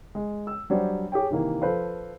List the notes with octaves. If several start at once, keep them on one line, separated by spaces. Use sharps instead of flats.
G#3
E6
F#3 G3 D4 C5 D5
G4 G#4 C#5 G5
C3 D#3 E3 A#3
F3 A4 B4 C5 F5